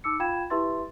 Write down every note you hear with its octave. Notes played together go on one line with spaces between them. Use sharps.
D#4 D6 E6 C#7
F4 F5 G5 B5 G#6 E7
E4 G4 B4 E5 C6 A6